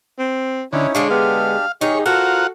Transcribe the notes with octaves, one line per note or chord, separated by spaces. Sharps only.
C4
D3 C#4 D#4 E4 C#5
D3 G#3 D4 G#4 C#5 F5
B3 D4 G4 F5
D#3 D#4 G4 G#4 C#5
F4 F#4 A4 A#4 C5 F#5 A#5